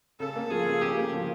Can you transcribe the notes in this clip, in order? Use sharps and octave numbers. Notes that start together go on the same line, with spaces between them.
C#3 A4
A#3
F3 G#4
C#3
C#3 G4
A#3
F3